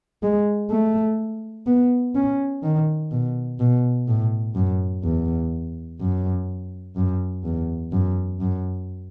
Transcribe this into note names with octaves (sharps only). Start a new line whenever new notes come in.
G#3
A3
B3
C#4
D#3
B2
B2
A2
F#2
E2
F#2
F#2
E2
F#2
F#2